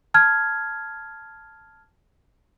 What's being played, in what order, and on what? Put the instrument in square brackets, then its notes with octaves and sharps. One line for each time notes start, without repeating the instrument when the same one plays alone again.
[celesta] A5 F6 G#6